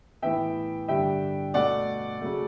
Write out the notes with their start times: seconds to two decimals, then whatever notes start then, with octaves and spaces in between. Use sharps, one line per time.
0.22 A2 E3 B3 E5 G5
0.88 G2 D3 G3 E5 G5
1.54 B2 A3 D5 F#5
2.21 C#3 F#3 A3